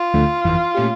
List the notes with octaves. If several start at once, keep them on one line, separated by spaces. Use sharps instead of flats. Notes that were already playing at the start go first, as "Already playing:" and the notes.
Already playing: F4
D2 D3 F3 A3
G1 F2 E3
A#2 A3 C#4 G4